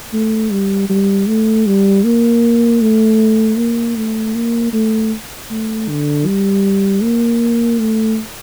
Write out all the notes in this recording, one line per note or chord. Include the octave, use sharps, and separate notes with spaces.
A3
G3
G3
A3
G3
A#3
A3
A#3
A3
A#3
A3
A3
D3
G3
A#3
A3